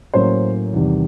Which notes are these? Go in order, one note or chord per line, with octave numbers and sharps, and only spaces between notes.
A2 F#3 A#3 C#4 C5
E2 C3 D#3 G3